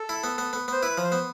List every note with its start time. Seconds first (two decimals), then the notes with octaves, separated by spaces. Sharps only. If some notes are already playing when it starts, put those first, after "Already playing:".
Already playing: A4
0.09 E4
0.24 B3
0.38 B3
0.53 B3
0.68 B3 C5
0.82 E4 B4
0.98 F3
1.04 C5
1.12 B3